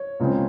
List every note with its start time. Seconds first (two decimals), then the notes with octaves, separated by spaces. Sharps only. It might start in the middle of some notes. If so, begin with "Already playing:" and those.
Already playing: C#5
0.20 C#2 C#3 G#3 C4